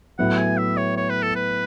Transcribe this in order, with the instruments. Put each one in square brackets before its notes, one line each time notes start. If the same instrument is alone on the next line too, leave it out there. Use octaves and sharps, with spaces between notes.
[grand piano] A2 F#3 B3 E4 [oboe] F#5
[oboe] G#5
E5
C#5
C#5
B4
A4
B4